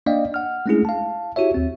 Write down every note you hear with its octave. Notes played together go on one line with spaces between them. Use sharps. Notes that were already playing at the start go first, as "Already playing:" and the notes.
A#3 D4 D5 D#5 F5 G5
F#5 F6
G#3 A3 C#4 D4 E4 G#4
F5 A5
E4 F#4 G4 C#5 E5
D#2 C4